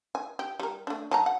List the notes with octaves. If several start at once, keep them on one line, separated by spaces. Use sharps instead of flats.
G#5
G4
G3 A#4
A3 D4
F#3 A5 A#5
F#5